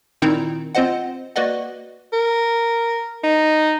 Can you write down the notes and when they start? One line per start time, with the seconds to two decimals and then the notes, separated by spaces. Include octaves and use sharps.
0.22 A#2 D#3 C4 D#4 E4 A#5
0.75 C4 F4 C5 D#5 F#5
1.36 A#3 F#4 B4 D5 D#5 F#5
2.13 A#4
3.24 D#4